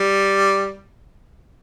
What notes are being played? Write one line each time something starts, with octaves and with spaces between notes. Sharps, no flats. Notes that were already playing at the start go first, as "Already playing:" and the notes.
Already playing: G3